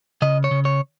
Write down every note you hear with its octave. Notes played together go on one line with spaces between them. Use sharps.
C#3 D#5
C#5
C#3
C#5